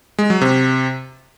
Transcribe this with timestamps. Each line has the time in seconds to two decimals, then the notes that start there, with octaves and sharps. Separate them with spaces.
0.19 G#3
0.30 F#3
0.41 C3